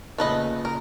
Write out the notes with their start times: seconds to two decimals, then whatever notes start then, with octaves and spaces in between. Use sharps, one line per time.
0.18 A#2 C#3 A3 B3 B4 D#5
0.65 A#4